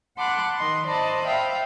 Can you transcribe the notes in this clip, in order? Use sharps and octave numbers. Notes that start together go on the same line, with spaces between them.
F#5 A5 B5 C6 D6 F#6
D#3 D#5 C6
C5 D5 D#5 A5 B5
E5 F5 G5